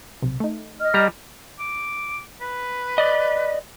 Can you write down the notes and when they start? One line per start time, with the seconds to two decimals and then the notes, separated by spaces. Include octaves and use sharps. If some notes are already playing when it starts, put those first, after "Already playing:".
0.22 B1 C3
0.40 A3 D#4
0.80 D#5 F6
0.94 G3 A#5
1.60 D6
2.41 B4
2.98 D5 D#5